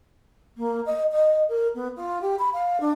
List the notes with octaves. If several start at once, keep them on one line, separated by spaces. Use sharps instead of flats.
A#3
D#5
D#5
A#4
B3
F4
G4
B5
F5
D4